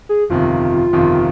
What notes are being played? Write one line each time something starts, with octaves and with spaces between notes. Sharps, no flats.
G#4
G1 F2 C3 D#3 F4
G1 F2 C3 D#3